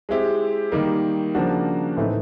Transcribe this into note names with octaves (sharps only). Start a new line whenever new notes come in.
G#3 C4 E4 G4
D#3 G3 A#3 D#4
C#3 F3 A#3 D4 F#4
A2 E3 A3 C4 D#4